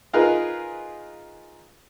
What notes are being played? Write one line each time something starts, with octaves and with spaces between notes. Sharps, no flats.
D#4 F4 G#4 A#4 B4